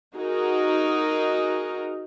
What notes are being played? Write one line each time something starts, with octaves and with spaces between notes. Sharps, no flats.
D#4 F#4 G#4 A#4